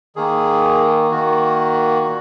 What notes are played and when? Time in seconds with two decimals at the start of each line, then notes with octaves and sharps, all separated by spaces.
0.16 D#3 A#3 G#4
1.11 D#3 A#3 F#4
2.05 A#2